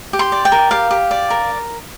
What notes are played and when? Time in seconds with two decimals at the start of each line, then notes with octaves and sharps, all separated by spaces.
0.13 G4
0.19 C6
0.32 D5
0.45 G5
0.52 A#4
0.71 G4 F5
0.91 G4
1.11 D5
1.30 A#4